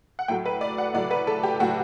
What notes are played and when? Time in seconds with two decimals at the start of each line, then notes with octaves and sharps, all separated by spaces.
0.19 F#5
0.28 A2 F#3 A3 G5
0.46 B4
0.61 D5
0.78 F#5
0.94 A2 F#3 A3 D5
1.11 B4
1.27 A4
1.43 G4
1.60 A2 F#3 A3 F#4